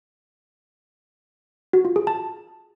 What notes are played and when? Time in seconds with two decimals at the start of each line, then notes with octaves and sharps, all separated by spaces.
1.73 F#4
1.85 F4
1.96 G#4
2.07 A5